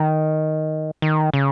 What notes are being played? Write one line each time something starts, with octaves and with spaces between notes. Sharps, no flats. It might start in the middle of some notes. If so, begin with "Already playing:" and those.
Already playing: D#3
D#3
C#3